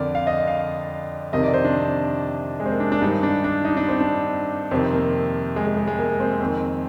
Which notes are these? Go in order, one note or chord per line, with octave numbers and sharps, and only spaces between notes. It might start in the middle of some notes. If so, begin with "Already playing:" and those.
Already playing: F2 D3 A#4 D5
F5
D#5
F5
F2 C3 D#3 D#5
D5
C5
D4
G#3
C4
A#3
D4
D4
G2 D#3 D#4
D4
D4
D#4
D4
C4
D4
F2 C3 D#3 C4
A#3
G#3
G#3
G#3
G#3
A#3
C4
F2 D#3